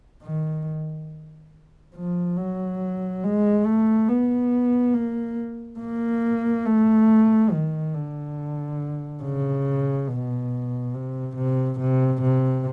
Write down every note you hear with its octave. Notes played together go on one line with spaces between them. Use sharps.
D#3
F3
F#3
G#3
A3
B3
A#3
A#3
A3
D#3
D3
C#3
B2
C3
C3
C3
C3